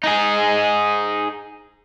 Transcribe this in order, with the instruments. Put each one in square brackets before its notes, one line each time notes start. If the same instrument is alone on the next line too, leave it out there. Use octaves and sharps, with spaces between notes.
[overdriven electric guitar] D#4 G#4